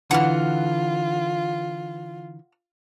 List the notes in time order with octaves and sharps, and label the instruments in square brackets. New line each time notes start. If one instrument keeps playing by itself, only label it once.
[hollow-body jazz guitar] D3 E3 [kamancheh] F4 [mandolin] F#5 F6